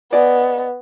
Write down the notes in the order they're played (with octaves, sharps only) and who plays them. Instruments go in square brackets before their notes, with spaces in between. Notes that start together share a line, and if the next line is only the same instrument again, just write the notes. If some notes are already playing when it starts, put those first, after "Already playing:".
[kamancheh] B3 [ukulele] G#4 D5 D#5